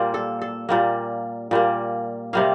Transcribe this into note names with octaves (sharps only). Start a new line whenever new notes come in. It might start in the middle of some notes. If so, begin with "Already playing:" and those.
Already playing: A#2 G3 A#3 C5
A4
A4
A#2 G3 A#3
A#2 G3 A#3
C3 G3 A#3 F5